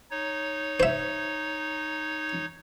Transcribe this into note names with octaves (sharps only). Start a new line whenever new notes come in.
D#4 C#5
C5 E5